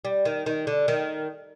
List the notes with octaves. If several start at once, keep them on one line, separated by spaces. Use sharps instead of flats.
G3
D#3
D#3
D3
D#3